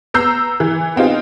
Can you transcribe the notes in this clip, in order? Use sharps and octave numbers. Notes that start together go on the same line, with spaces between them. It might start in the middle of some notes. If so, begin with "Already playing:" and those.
B3 A#5 E6 G6 C7
E3
B3 C4 D#4 F4